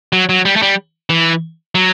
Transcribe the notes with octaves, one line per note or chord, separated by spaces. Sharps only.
F#3
F#3
G3
A3
G3
E3
F#3